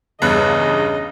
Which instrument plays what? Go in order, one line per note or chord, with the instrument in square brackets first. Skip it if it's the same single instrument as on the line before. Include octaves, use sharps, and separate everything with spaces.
[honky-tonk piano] E2 G2 F#6 [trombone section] C#3 [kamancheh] D#5